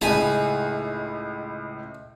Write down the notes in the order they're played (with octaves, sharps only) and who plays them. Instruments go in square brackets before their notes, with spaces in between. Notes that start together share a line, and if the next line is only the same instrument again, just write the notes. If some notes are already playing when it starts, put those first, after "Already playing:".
[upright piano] C#2 A2 [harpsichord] D#4 G#4 A5 [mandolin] G#5 B5